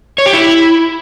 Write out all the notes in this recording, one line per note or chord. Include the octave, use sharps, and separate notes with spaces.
C#5
G4
E4